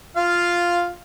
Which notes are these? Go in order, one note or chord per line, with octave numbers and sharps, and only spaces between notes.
F4 F5